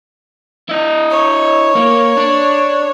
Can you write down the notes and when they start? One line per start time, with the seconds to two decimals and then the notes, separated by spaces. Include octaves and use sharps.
0.69 E4 D#5
1.10 C#5
1.75 A#3
2.17 D4